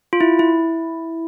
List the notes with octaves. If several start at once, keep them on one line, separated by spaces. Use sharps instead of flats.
F4
E4
E4